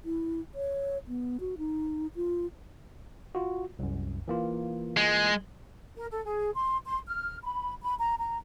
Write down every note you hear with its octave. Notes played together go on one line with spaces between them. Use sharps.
E4
C#5
B3
F#4
D#4
F4
F4 F#4
C2 F#2
E3 A#3 F4
G#3
A#4
A4
G#4
C6
C6
F6
B5
B5
A#5
A#5